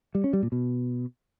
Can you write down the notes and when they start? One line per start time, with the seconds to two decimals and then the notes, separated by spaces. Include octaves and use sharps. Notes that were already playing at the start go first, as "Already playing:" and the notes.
0.15 G3
0.24 C#4
0.33 G3
0.43 A#2
0.52 B2